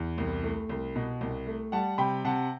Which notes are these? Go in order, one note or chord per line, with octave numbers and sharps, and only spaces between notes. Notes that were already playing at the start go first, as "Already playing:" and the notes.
Already playing: E2
C2
A3
C2
B2
C2
A3
G3 F#5 A5
C3 G5 B5
C3 F#5 A5